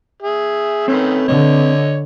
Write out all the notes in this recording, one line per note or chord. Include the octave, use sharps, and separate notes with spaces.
G#4 E5
D#3 A3 C4 C#4 B4
D3 C#5 D#5